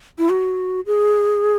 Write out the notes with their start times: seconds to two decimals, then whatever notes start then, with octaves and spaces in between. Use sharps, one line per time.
0.18 E4
0.30 F#4
0.86 G#4